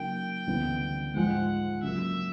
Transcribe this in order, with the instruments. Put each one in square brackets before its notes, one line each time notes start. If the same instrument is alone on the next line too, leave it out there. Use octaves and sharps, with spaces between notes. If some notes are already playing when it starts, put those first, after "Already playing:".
Already playing: [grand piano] C#3 F#3 A#3 D#4 [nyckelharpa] G5
[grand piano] D2 C#3 E3 G3 B3
[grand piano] G#2 F3 G#3 [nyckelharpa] F#5
[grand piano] C#3 F#3 A#3 [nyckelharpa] E5